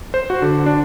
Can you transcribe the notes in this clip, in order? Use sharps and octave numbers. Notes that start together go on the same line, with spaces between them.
C5
F#4
D3
D4